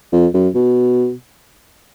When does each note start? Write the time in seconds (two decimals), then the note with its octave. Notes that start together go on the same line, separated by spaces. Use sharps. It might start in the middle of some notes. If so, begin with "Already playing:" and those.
0.13 F2
0.34 F#2
0.55 B2